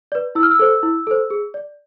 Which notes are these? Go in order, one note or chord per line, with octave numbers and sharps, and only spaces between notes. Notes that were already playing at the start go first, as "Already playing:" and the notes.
B4 D5
E4 E6
F6
E6
A4 C5
E4
A4 C5
G#4
D5